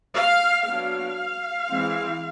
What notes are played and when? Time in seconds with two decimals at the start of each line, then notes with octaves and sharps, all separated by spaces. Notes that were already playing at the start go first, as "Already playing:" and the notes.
0.14 F5
0.66 F#3 B3 D4 F5
1.69 E3 G#3 C4